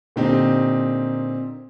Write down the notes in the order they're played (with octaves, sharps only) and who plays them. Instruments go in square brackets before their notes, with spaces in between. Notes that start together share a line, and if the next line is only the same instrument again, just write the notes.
[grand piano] A#2 D3 C4 D#4 G4